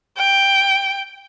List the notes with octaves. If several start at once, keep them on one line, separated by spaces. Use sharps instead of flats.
G5